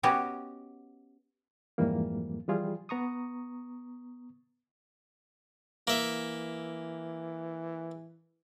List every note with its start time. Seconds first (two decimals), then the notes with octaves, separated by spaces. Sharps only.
0.03 B3 C#4 F#4 G4 D#5
1.78 F2 G#2 E3 G3 A#3
2.48 E3 F3 G3 F4 G#4
2.89 B3 A#5 C#6 D#6
5.87 E3 A#3 E5